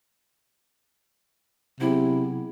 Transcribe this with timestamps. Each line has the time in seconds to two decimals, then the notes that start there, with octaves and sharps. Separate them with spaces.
1.80 C3 F#3 B3 E4 G#4